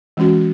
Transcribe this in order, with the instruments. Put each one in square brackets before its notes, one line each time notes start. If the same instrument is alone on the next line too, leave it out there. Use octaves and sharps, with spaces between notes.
[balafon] E3 G#3 C#4 F#4